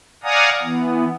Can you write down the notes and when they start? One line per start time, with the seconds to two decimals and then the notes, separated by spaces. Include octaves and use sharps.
0.23 D5 F5 F#5 G#5 A#5 D#6
0.63 E3 B3